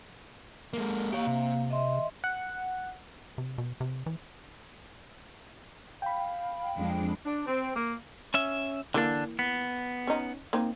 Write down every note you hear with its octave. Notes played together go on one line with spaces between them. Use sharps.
G#3 A#3
A#3 G4 C#5 F5
C3
D#5 E5 C6
F#5
C3
B2
C3
E3
F5 G5 B5
F2 G#3 D4
D4
C4
A#3
C#4 E5
D3 E3 A#3 D4
B3
C#4 D#4
A#3 C4 D#4